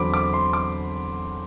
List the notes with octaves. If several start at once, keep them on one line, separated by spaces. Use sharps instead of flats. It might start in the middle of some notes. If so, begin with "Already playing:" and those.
Already playing: E2 D3 F#3 C4 B5 D6
D6
C6
D6